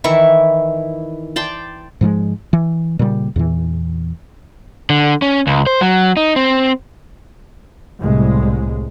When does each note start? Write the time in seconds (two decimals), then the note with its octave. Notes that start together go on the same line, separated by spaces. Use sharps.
0.04 D#3 E3 E4 C#6
1.36 D5 G5 A5 C6
2.01 G#2 F3 F#3 G#3
2.53 E3
2.99 A#2 C#3 G3
3.36 E2 A#2 E3
4.90 D3
5.22 C#4
5.47 C#2
5.67 C5
5.81 F#3
6.17 D#4
6.36 C4
8.01 C2 A2 G#3